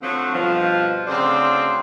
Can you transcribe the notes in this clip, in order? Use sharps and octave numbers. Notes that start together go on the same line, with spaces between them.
D3 F3 F#3 A3 C4
G2 B2 F3
D2 C#3 C4 C5 D5